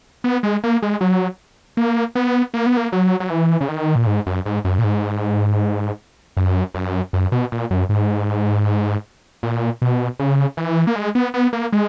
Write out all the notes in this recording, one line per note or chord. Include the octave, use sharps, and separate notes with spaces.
B3
G#3
A#3
G#3
F#3
A#3
B3
A#3
B3
A#3
F#3
F#3
E3
C#3
D#3
A#2
G#2
F#2
G#2
F#2
A#2
G#2
F#2
F#2
F#2
B2
A#2
F#2
G#2
A#2
B2
C#3
E3
A#3
G#3
B3
B3
A#3
G#3